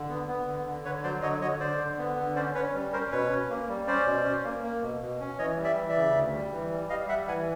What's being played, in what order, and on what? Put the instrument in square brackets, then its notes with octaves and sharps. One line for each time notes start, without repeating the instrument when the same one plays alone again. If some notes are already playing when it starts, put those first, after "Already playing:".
Already playing: [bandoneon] D3
B3
B3
D3
D3
D3 B4 C#5
F#3 C5 D5
D3 C#5 D#5
D3 C#5 D#5
D3 C5 D5
D3
B3
D3
C#4 C5 D5
C#4 B4 C#5
G3
C#4 A#4 C5
B2 B4 C#5
C#4
A#3
G3
C#4 C5 D5
B2
C#4
A#3
A#3
B2
B2
C#4
E3 C#5 D#5
G3
D5 E5
E3
D5 E5
C#3
D2
G3
E3
G3
G3 D#5 F5
G3 E5 F#5
E3 F#5 G#5